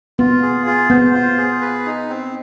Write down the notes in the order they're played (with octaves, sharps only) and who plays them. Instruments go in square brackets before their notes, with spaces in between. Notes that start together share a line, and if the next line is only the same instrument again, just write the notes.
[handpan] B3 [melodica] F4
[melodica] G#4
F4
[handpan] B3 [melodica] C5
[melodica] F4
G#4
B4
D#4
C4